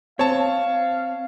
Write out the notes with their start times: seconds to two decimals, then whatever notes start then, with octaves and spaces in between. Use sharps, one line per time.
0.19 C4 C5 C#5 F5 A5